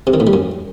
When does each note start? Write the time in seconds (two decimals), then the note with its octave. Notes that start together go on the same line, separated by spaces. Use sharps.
0.07 C3
0.14 D#3
0.20 A2
0.27 G3
0.33 F#2